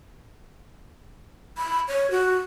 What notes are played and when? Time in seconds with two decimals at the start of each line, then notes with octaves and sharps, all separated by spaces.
1.57 B5
1.88 C#5
2.11 F#4